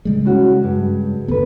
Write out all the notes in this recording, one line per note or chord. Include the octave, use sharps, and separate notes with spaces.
C#3 G3 G#3
C#4 E4 F#4
G2
D2 B3 A4 B4